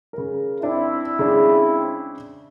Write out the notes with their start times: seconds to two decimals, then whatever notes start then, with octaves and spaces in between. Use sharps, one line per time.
0.13 C#3 A#4
0.63 C4 D4 E4
1.19 C#3 G#3 D4